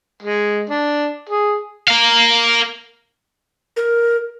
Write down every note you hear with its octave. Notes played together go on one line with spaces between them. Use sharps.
G#3
D4
G#4
A#4 F5
A#4